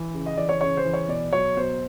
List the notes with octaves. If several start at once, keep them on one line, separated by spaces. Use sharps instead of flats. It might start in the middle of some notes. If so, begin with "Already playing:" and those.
Already playing: E3
C#3
D#5
E3 D5
C#5
C#3 C#5
C5
E3
C#5
B2 D5
F#3 C#5
B2 C5